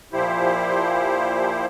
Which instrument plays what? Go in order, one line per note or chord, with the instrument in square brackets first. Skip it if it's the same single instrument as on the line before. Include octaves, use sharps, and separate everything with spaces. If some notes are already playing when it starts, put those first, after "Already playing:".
[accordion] A#2 F3 E4 G4 C5